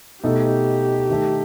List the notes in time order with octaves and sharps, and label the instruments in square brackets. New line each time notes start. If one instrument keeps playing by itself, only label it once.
[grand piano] B2 A3 D#4 A4 [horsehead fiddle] G4
[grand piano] D#3 A3 D#4 A4